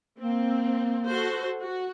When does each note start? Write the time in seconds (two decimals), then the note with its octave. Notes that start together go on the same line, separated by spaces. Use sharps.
0.20 A#3 C4
1.07 F#4 A4 C5
1.60 F#4